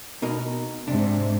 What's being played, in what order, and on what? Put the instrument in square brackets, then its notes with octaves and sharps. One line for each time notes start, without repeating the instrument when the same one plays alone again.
[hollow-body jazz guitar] B2 D#4 A#4
[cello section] G#2 C3 [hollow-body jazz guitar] D4